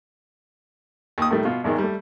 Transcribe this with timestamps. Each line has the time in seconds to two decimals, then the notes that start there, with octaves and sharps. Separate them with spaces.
1.18 D#2 D#6
1.31 A2 D#3 G3 A3
1.45 B2 F4
1.64 E2 G#2 D#3 G#3
1.78 G3 A3